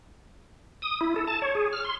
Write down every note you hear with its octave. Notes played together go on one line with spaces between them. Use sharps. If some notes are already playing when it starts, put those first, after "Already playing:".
D#6
E4
A4
A5
C#5
G#4
F6
C6